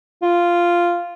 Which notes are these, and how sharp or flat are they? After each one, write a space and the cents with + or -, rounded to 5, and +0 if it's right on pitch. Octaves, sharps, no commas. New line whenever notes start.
F4 -5